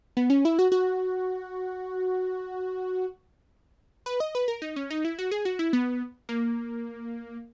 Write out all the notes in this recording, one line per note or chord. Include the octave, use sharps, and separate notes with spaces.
B3
C#4
E4
F#4
F#4
B4
D#5
B4
A#4
D#4
C#4
D#4
E4
F#4
G#4
F#4
E4
B3
A#3